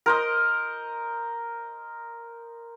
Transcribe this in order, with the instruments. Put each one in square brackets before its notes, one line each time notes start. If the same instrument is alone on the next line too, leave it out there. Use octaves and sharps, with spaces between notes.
[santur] A#4 C5 D#5